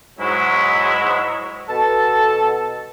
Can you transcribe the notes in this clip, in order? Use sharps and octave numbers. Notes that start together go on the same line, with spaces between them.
G#2 F#3 G#3 E4
B2 A4 A5